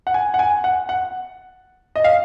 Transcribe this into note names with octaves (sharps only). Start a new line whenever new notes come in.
F#5
G#5
F#5
G#5
F#5
F#5
D#5
F5